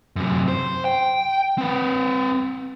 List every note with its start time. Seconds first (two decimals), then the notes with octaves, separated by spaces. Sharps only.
0.16 F#2 C3
0.48 C5
0.85 G5
1.58 C4 B4